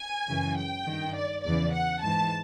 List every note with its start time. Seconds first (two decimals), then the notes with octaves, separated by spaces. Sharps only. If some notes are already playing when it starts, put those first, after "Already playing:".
Already playing: G#5
0.27 F#2 C#3 E3
0.57 G5
0.86 G2 D#3
1.15 D5
1.43 E2 C#3 E3 D5
1.73 F#5
2.02 G#2 E3 A5